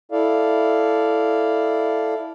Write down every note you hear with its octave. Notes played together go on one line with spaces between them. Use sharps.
E4 A4 D5 F5